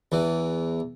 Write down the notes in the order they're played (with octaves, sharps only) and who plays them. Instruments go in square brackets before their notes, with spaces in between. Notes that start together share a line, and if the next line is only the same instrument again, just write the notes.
[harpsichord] E2 E3